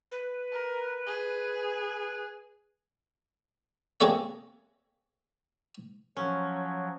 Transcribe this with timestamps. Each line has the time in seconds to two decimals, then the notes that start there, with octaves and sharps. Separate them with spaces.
0.12 B4
0.52 A#4
1.07 G#4
4.00 A#3 C4 G#4 A4 C#5 E5
6.16 F3 F#3 C#4